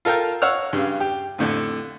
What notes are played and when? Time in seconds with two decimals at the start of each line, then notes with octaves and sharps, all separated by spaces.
0.05 F4 A4 A#4 F5 G5
0.42 C#5 F5 F#5 E6 F6
0.73 G2 C#3
1.00 G4
1.39 F2 A2 D3